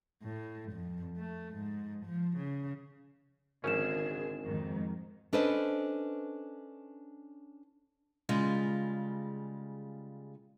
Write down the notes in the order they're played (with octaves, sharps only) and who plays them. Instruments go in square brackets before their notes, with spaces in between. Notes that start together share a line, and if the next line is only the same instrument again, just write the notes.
[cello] A2
F2
A3
G#2
F3
C#3
[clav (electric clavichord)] G#1 C#4 [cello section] D3 G#4 [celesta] A#4 E7
[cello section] F2 G#2 D#3
[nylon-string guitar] C#4 D4 A4 B4 C5 D#5
[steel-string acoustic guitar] C#3 G3 G#3 F4